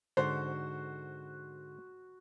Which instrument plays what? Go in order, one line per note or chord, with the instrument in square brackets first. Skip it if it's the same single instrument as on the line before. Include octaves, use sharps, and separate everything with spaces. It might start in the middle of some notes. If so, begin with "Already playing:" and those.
[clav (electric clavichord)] G#2 D3 [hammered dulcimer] F#4 [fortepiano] C5